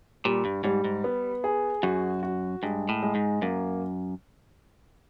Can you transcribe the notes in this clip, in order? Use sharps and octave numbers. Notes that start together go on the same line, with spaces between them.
A#2 G3
G2
G#2 G3
G#2
B3
G#4
F#2 F#4
F#4
G2 G#3
A2
G#3
G#2
F#2 A#3